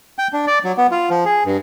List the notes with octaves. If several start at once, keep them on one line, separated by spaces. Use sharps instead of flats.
G5
D4
D5
F#3
B3
F4
F3
G#4
G2